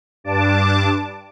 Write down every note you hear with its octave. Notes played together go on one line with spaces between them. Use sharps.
G2 D4 A5 D6